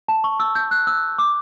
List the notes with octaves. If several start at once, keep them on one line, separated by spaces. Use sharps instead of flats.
A5
C#6
E6
G6
F#6
E6
D6